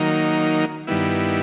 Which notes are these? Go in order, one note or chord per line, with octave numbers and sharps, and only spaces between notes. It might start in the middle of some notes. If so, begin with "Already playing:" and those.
Already playing: D#3 F#3 A#3 D#4
G2 D#3 G3 B3 E4